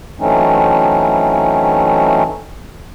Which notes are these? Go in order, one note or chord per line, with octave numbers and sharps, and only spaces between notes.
E3 F#3 A3 C4 C#4 D#4